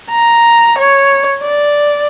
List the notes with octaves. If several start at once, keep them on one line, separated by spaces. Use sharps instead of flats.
A#5
C#5
D5